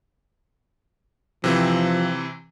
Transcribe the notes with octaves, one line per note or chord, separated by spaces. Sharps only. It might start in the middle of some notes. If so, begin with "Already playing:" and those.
C3 E3 F3 C4